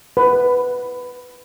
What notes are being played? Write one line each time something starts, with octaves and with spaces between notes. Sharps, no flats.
B4